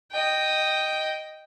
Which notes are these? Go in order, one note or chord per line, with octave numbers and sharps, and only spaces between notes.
D#5 G5